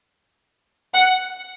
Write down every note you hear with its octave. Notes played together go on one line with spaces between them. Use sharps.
F#5